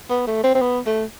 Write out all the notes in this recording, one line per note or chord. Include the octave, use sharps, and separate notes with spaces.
B3
A3
C4
C4
B3
A3